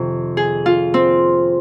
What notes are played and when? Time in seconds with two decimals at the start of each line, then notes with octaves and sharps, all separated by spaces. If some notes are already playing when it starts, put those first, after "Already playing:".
Already playing: F2 C3 D#3
0.37 G#4
0.66 F4
0.94 C4